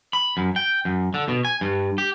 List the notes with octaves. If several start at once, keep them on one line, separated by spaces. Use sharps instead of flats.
B5
F#2
G5
F#2
D3
B2
G#5
G2
G4